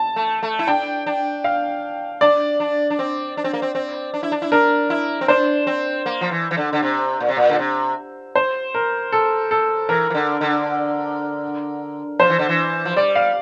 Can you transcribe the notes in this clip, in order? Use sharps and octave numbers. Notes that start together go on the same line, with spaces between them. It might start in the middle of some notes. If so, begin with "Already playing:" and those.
Already playing: A5
A3
A3
E4
D4 G5
D4
F5
D4 D5
D4
D4
C4
D4
C4
A#3
C4
C4
D4
E4
D4
E4
D4 A#4
E4
C4
D4 C5
C4
A#3
F3
E3
E3
D3
D3
C3
A#2
C3
A#2
D3
C3
C5
A#4
A4
A4
E3 A#4
E3
D3
D3
F3 C5
E3
D3
E3
F3
G3 D5
F5